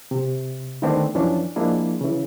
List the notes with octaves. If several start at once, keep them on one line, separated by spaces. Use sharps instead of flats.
C3
D3 D#3 A3 B3 C4 D4
F#2 E3 F3 C#4 D4
F3 G#3 A#3 D4 E4
C#3 E3